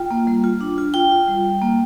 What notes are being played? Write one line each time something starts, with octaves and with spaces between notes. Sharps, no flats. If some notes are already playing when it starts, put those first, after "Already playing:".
Already playing: F4 G5
A#3
G3
F4
D4
F4
F4 G5
F4
G3
G3
A#3